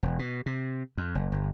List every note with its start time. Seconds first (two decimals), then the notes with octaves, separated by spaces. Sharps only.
0.03 E1
0.19 B2
0.46 C3
0.97 F2
1.15 F#1
1.32 G1